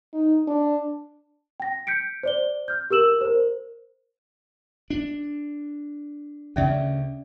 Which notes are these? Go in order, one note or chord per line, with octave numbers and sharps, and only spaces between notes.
D#4
D4
G5 A#6
G6 B6 C#7 D7
C5 D5 G7
F6 G6
G4 A#4 E6 E7 F#7
A#4 C5
D4
D2 C#3 C#4 D5 E5